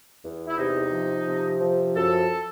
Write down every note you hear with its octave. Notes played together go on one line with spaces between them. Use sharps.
E2
E4
C3 D#4
F3
C3
F3
F#2 A4